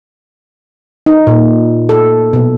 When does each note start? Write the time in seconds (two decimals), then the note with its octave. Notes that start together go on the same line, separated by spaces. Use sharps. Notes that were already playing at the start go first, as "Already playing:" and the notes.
1.06 D#4
1.27 A#2
1.89 A4
2.33 B2